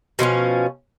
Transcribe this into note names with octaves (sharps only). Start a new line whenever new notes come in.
B2 F3 A#3 C#4